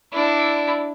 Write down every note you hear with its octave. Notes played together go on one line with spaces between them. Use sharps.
D4 E4